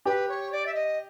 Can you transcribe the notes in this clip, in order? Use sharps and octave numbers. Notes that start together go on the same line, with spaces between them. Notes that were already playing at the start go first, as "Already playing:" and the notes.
G4 B4
C#5
D5
E5
D#5